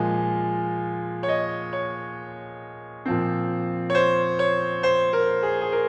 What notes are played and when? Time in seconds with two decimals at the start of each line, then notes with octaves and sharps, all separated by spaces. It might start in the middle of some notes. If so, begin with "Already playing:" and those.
Already playing: A#2 F3 G#3
1.23 C#5
1.28 D#5
1.73 C#5
3.06 A#2 F3 C4
3.90 C#5
3.95 C5
4.39 C#5
4.83 C5
5.13 A#4
5.43 G#4
5.61 G#4
5.72 A#4